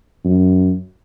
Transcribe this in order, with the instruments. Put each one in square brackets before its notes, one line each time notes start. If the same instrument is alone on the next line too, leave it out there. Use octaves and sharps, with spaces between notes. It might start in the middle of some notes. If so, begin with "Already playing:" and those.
[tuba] F#2